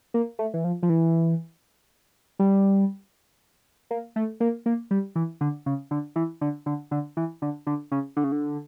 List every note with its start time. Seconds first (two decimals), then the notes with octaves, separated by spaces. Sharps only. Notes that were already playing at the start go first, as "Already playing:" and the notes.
0.14 A#3
0.39 A3
0.54 E3
0.64 F3
0.83 F3
0.89 E3
2.39 G3
3.91 A#3
4.16 A3
4.40 A#3
4.66 A#3
4.91 G3
5.16 E3
5.41 D3
5.66 C#3
5.91 D3
6.16 E3
6.41 D3
6.66 D3
6.91 D3
7.17 E3
7.42 D3
7.67 D3
7.92 C#3
8.16 D3
8.24 C#3
8.32 D3